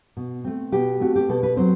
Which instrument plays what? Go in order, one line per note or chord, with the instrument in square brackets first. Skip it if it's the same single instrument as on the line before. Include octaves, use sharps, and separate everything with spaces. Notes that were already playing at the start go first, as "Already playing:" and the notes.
[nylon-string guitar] B2
A3 C4
B2 G4
A3 C4 F#4
G4
B2 A4
B4
F#3 C4 C5